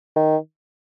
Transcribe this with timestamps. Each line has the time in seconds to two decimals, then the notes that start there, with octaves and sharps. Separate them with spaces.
0.16 D#3